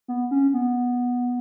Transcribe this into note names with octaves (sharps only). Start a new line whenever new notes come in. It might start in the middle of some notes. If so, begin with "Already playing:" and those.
B3
C#4
B3